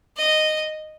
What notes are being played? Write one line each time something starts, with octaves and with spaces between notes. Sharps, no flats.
D#5